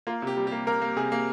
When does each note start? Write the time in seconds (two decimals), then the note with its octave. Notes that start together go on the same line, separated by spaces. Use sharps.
0.07 A#3 F4
0.22 C3 G4
0.37 G3
0.47 G4
0.52 A#3
0.67 A#3 A#4
0.82 A#3
0.96 C3 G#4
1.12 A#3